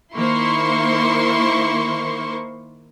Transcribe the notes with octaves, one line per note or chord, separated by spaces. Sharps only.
D#3 A#3 E4 C5 C6 C#6